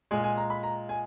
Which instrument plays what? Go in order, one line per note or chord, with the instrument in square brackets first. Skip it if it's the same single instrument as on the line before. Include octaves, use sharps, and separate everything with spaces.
[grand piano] A#2 G#3 G#5
G#5
A#5
B5
A#5
G#5